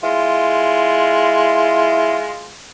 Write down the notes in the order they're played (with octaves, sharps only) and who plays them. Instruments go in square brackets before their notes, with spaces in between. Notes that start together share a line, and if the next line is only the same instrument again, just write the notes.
[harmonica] G#3 F4 [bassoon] E4